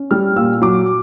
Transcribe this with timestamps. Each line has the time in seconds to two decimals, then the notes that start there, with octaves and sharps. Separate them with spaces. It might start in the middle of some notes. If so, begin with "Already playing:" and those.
Already playing: C#4
0.11 G3 F6
0.36 A#2 E6
0.62 F#3 D6